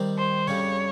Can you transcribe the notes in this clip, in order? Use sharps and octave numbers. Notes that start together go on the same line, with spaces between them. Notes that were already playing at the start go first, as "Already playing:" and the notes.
Already playing: D#3 G3 C4
C5
F2 C#3 G3 C#4 C#5